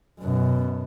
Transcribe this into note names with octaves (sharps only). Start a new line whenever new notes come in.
F#2 B2